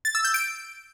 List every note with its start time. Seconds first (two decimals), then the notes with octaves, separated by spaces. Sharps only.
0.05 A6
0.15 E6
0.24 G6
0.34 D7